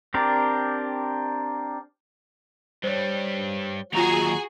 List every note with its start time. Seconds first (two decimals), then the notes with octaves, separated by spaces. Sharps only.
0.14 C4 D4 G4 A#4 D5
2.84 G2 G3 C5 C#5
3.93 D#2 F#3 F4 F#4 G#4 A#5 F7